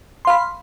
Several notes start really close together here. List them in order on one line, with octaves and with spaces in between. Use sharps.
C6 F5 B5